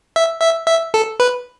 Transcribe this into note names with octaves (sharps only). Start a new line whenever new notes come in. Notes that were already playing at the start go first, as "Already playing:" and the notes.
E5
E5
E5
A4
B4